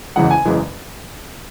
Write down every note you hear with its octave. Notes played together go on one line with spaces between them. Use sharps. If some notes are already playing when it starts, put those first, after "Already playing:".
F#1 E2 C#3 E3 G#3 F#5
G#5
F#1 E2 C#3 E3 G#3